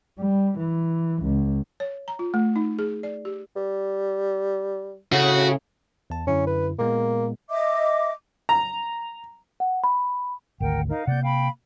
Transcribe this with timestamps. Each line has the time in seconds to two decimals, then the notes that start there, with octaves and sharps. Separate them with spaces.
0.19 G3
0.59 E3
1.23 C#2
1.80 C#5
2.08 A#5
2.19 F4
2.34 A3
2.56 D#4
2.79 G#4
3.03 D5
3.25 G4
3.56 G3
5.12 A2 C#3 F#4
6.10 E2 A5
6.27 F#2 D3 C#4 E4
6.47 B4
6.79 A#2 G#3 A#3 B3
7.50 D#5 E5 D6
8.49 A#5
9.60 F#5
9.84 B5
10.60 G#1 D2 A#4 F#5 G5
10.89 D#4 A#4 F5
11.07 C3 A#3 D5 F#5 G6
11.23 F5 G5 B5